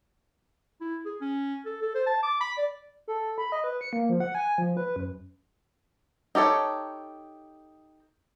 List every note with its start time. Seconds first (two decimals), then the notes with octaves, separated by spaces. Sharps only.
0.81 E4
1.06 G#4
1.21 C#4
1.66 A4
1.82 A4
1.95 C5
2.07 A5
2.23 D6
2.41 B5
2.58 D5
3.08 A4
3.38 B5
3.52 D#5
3.64 B4
3.81 C#7
3.93 A#3
4.09 F3
4.20 F#5
4.35 G#5
4.58 F3
4.77 B4
4.96 F#2
6.35 D#4 G4 A4 C#5